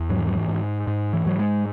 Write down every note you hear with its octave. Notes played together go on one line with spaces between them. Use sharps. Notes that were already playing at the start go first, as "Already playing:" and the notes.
Already playing: E2
G#2 F#3
E3
F#3
E3
G#2
G#2
E3
G#2 F#3
G#3